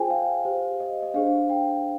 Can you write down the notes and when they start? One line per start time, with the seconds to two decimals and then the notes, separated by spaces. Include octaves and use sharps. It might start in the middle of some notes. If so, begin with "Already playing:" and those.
Already playing: F4 G#4 C5 G5 G#5
0.10 F5
0.45 G4 C5
0.80 D#5
1.02 D#5
1.14 D4 G#4 C5 F5
1.50 G5